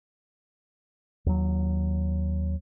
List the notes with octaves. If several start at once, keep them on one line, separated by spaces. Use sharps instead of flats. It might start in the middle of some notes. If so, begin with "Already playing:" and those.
D#2 F#3